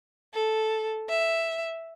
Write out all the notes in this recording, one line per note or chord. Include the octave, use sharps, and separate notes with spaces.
A4
E5